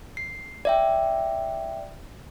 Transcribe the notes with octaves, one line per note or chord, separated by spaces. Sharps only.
C7
D5 E5 G5